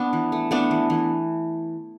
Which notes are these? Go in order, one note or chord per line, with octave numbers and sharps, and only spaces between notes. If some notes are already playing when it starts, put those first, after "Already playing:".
Already playing: B3 D4
E3
A3
A3 B3 D4
E3
E3